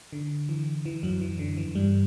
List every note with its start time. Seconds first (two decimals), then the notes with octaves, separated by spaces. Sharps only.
0.13 D3
0.49 E3
0.86 E3
1.03 F#2 F#3
1.21 E3
1.39 D3
1.57 E3
1.75 G2 G3